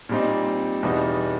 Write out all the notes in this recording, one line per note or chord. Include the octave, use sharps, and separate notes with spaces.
A#2 G3 C4 D#4
E2 B2 G3 B3 D#4